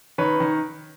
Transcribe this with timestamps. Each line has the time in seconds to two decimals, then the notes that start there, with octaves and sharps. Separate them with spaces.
0.18 D#3 B4 C#5
0.40 D#3